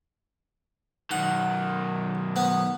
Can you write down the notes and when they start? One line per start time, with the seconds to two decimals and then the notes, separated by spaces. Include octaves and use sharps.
1.11 B1 D#3 F#5
2.36 B3